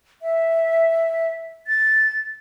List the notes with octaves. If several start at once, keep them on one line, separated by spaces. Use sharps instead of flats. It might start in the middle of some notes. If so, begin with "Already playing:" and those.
E5
A6